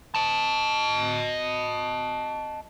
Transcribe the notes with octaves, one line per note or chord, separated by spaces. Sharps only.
D#5 A5